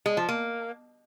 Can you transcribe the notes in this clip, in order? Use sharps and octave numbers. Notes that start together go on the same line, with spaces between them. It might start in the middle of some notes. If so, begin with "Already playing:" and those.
G#3
F3
A#3